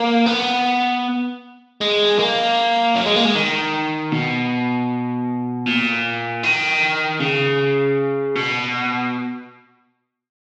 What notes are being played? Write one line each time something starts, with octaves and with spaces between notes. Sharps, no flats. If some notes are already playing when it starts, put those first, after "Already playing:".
Already playing: A#3
B3
G#3
A#3
F#3
G#3
A#3
G#3
D#3
B2
A#2
D#3
C#3
B2